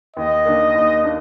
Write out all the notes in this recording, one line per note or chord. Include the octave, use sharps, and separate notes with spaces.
D#2 D#5
D#3 A#3 D4
D#2
A#3 D4